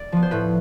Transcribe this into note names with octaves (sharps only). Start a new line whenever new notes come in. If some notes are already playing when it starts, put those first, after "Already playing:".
Already playing: D5
F3 B3
C5
A2 B4